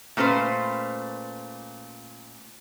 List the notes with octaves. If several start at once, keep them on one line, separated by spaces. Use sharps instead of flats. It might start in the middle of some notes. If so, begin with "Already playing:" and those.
A#2 A3 C#4 B4 C5